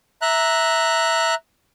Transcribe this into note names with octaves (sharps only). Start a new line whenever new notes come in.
E5 A#5 F#6